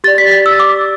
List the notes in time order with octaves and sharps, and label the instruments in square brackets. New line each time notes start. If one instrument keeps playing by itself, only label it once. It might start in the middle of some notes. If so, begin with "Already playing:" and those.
[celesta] G4 D5 A6
B6
A6
E6
D6